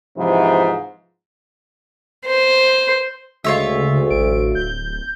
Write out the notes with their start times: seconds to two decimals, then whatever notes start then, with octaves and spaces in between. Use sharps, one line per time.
0.17 G#2 C3 E3 F3
2.26 C5
3.44 D2 C#3 G#3 F4 C#5 E5
4.11 A1 D7
4.55 D1 G6